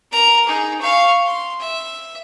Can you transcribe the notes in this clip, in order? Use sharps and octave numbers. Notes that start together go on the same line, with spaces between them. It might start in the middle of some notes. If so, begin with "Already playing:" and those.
A#4 A#5
D#4 G#4
F5 C#6
C6
E5